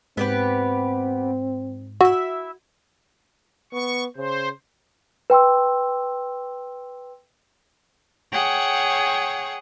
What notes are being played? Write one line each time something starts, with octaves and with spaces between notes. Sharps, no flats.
G#2 B3 C4 G4 B4
E4 F#4 E5
B3 C#6
C#3 C5
B4 G5 C6 E6
G#4 C#5 F#5 G5